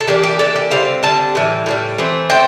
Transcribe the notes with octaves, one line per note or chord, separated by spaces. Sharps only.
A4
E3 A#3 D4 G4
G4
E3 A#3 D4 A4
G4
D3 G3 C4 F5
D3 G3 C4 A5
A2 E3 G3
A2 E3 G3
E3 A3 C4
A3 C4 G5